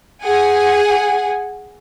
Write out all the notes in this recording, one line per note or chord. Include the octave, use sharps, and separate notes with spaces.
G#4 F#5 G#5